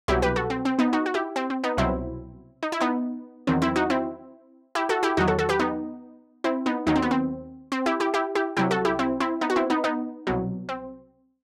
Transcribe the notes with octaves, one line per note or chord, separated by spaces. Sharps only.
C2 B2 F#3 E4 G4
G4 B4
F#4 A4
C4
C4
B3 D#4
D#4 F#4
F#4
E4 G4
C4
C4
B3 D#4
C2 B2 F#3 C4 E4
D#4
E4
B3 D#4
E2 D#3 F#3 C4
C4 E4
D#4 F#4
C4 E4
E4 G4
F#4 A4
E4 G4
E2 D#3 F#3 D#4 F#4
F#4 A4
F#4 A4
G4 B4
B3 D#4
C4 E4
B3 D#4
D#2 D#3 F#3 D#4
C4
B3
C4
C4
E4 G4
E4 G4
E4 G4
E4 G4
C2 C3 F#3 E4 G4
F#4 A4
E4 G4
C4 E4
C4 E4
B3 D#4
F#4
C4 E4
B3 D#4
B3 D#4
C2 B2 F#3
C4